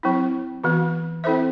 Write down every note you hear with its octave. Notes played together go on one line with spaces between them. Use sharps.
F#3 C4 E4
E3 B3 F#4
C4 E4 A4 C5 E5